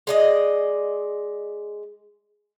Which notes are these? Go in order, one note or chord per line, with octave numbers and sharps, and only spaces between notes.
G#3 D5 D#5